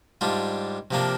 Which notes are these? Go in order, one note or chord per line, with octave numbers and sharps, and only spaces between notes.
G#2 G3 D4 F4
C3 F3 A#3 D4